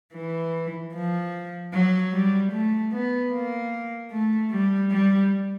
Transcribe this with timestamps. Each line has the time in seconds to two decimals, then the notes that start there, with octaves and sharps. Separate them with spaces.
0.14 E3
0.94 F3
1.73 F#3
2.13 G3
2.52 A3
2.92 B3
3.32 A#3
4.11 A3
4.51 G3
4.91 G3